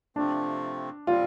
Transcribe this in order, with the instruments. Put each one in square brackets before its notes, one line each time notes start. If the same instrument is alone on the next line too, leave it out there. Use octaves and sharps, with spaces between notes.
[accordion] C3 F3 A3 C4 [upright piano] D4
[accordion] G3 C4 [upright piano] F4